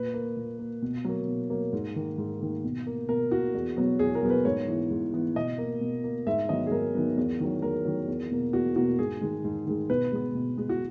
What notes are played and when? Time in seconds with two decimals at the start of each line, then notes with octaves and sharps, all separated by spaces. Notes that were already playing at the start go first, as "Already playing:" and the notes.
Already playing: A#2 B4
0.14 A#3
0.37 A#2
0.59 A#3
0.82 B2
1.05 F#3 A#3
1.27 B2
1.50 F#3 A#3
1.73 G#2
1.96 D#3 A#3
2.18 G#2
2.41 D#3 A#3
2.64 B2
2.87 A#3
3.09 B2 A#4
3.31 A#3 F#4
3.54 E2
3.77 B2 F#3 B3
3.99 E2 G#4
4.15 A#4
4.23 B2 F#3 B3
4.30 B4
4.45 G#2 C#5
4.67 E3 B3
4.91 G#2
5.13 E3 B3
5.36 B2 D#5
5.58 A#3
5.81 B2
6.04 A#3
6.27 G#2 E5
6.49 D#3 F#3 B3 D#5
6.67 G#4
6.72 G#2 A#4
6.95 D#3 F#3 B3
7.17 E2
7.40 D#3 F#3
7.62 E2 A#4
7.85 D#3 F#3
8.08 E2
8.31 B2 A#3
8.53 E2 F#4
8.76 B2 A#3 F#4
8.98 G#2 G#4
9.21 D#3 G#3
9.44 G#2
9.66 D#3 G#3
9.89 B2 B4
10.12 G#3 B3
10.35 B2
10.57 G#3 B3
10.69 F#4